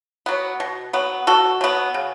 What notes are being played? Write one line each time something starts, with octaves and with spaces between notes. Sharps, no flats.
F#3 B3
B2
F#3 B3
B2 F#4 A4
F#3 B3
C#3